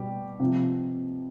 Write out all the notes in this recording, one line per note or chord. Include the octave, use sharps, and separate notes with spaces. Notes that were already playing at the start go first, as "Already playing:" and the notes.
Already playing: B2 G3 G4
C3 F3